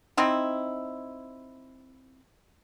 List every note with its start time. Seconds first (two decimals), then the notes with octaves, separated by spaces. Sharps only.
0.17 C4 D#4 E4